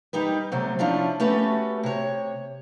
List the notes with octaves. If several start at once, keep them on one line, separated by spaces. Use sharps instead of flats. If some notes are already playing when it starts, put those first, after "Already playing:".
G3 D#4 G4 B4
C3 F#3 A3 C4 C5 F#5
F3 C#4 D4 E4 F4
A3 C#4 F#4 G4 A4 B4
C3 C#5